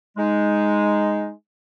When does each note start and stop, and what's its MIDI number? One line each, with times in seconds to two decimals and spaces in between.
0.17 1.31 56
0.17 1.31 63